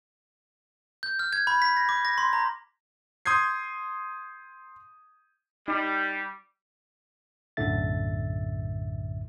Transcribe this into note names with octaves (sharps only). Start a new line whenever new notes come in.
G6
F6
G#6
B5
B6
A#6
D6
A#6
C6
A#5
C6 D#6 G6 G#6 C7
G3 D#4
B1 F#2 A2 D3 E5 A6